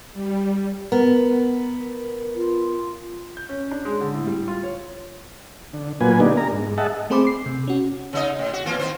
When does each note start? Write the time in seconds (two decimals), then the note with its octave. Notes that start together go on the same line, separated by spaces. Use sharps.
0.14 G3
0.92 B3 A#4
2.36 F4
3.37 G6
3.49 C#4
3.71 D4
3.85 G#3
4.01 D3
4.14 A2
4.27 G3
4.48 F4
4.63 C#5
5.74 D3
6.01 A#2 F#3 A#3 F4 B4 G#5
6.20 D3 A#3 B3 D4 D#4 G4
6.37 A#4 A#5
6.52 G#2
6.78 G#4 D#5 E5 F#5 A5
7.10 A3 C4 G#4 C5 B5 D6
7.24 D6 C7
7.46 C3
7.67 C#4 F#4
8.13 C#3 D#4 D#5
8.39 A2
8.53 F#4
8.66 E3 A#3 F4
8.79 D#3 C5